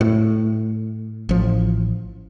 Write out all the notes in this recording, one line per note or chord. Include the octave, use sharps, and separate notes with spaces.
A2
A1 F3